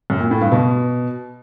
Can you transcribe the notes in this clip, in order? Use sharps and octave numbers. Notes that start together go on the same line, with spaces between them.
F#2
A#2
A2
G2
B2